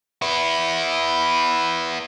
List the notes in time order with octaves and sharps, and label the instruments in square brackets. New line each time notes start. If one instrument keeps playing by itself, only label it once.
[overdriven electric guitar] B3 E4